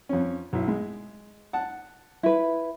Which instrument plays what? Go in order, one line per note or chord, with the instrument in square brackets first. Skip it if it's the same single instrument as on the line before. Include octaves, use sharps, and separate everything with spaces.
[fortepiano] F2 C#4
B1 E4
G#3
F#5 A5
[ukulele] E4 B4